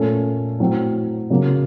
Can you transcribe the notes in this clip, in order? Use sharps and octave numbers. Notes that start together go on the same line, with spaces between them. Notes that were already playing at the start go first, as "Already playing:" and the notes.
Already playing: A#2 A3 C#4 A4
A2 F#3 C4
C#3 F#3 A#3